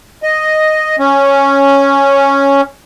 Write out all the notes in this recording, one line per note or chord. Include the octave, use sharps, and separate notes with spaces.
D#5
C#4